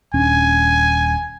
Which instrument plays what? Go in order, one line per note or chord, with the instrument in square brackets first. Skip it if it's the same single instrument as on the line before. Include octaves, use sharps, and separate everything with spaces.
[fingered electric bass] D#1 C#4 D4 [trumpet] G#5